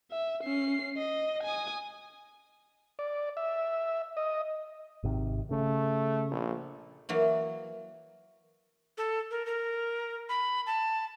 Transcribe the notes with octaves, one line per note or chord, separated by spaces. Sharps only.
E5
C#4 C7
D#5
G#5 D#6
D5
E5
D#5
G#1 C3 D#3
C#3 A3
A#1
E3 F#3 A#3
A4
A#4
A#4
B5
A5